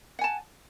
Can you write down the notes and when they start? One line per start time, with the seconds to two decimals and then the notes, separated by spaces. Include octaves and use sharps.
0.19 F#5
0.21 G#5
0.24 A5